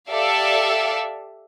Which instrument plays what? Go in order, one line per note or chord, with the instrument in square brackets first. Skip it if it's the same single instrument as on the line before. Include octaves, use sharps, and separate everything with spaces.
[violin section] G4 A4 D5 E5 F5